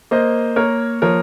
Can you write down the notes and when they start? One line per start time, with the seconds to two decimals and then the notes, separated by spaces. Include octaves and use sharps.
0.11 A#3 C5 D#5
0.56 A#3 A#4 C#5
1.02 F3 A#4 C#5